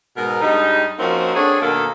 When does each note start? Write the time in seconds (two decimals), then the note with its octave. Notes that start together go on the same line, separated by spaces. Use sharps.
0.17 G#2 B2 D#4 A#4
0.42 G2 G3 G#3 D#4
0.99 F3 A#3 C4 C#4 D#4 F#4
1.35 C4 D4 F#4 G#4 A4 C#5
1.62 D#2 B2 D#3 A#3 D4 A4